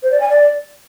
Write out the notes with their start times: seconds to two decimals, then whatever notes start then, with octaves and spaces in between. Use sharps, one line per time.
0.03 C5
0.11 D5
0.20 G#5
0.29 D5